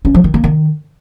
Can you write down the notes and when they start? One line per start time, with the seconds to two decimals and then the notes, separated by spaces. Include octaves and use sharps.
0.05 C#4
0.14 F3
0.24 D#3
0.34 A#3
0.44 D#3